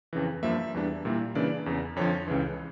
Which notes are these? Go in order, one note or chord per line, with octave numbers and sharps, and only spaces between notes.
F2 C#3 E3
G2 F3 A#3 E5
E2 E3 G3 D4
A#2 G3 A#3 E4
C#3 E3 A#3 D4 D5
E2 C#3 E3
F2 D3 F3 C#5
C#2 C#3 E3